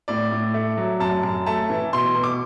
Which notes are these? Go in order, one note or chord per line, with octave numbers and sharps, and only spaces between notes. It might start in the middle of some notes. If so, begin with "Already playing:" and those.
A2 D5
A2
A3
F#3
F#2 A5
F#2
A3 A5
E3
B2 C6
B2
D6